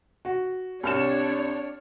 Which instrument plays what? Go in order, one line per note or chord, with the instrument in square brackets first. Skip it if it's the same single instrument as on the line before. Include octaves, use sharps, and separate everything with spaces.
[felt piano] F#4
[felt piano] C2 F6 E7 [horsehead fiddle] D4 C#5